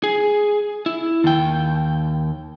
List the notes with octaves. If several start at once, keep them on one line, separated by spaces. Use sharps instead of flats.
G#4
E4
D#2 G5